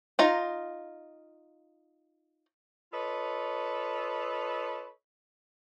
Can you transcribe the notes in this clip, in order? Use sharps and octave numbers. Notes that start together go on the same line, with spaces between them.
D#4 F4 A#5
F4 A4 B4 C#5 D#5